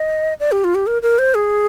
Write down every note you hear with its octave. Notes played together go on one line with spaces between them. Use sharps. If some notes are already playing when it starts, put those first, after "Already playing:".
Already playing: D#5
D5
G4
F4
G4
A#4
A#4
C5
G#4